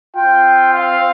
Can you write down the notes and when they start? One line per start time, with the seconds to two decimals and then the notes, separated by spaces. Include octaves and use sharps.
0.17 C4 F4 G5
0.74 F5